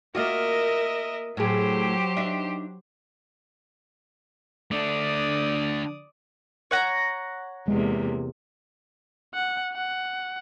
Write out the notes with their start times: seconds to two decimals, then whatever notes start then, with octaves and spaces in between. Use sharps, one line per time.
0.15 A#3 F4 F#4 A#4 D#5 E5
1.37 A2 F#3 G4 G#4 C5
2.17 D4 D#4 E5
4.71 D3 A3 D4 D5 D#6
6.71 C#5 F#5 A#5
7.68 E2 C3 G#3 A#3
9.35 F#5
9.73 F#5